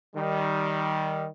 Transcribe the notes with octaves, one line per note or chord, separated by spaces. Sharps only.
D#3 G3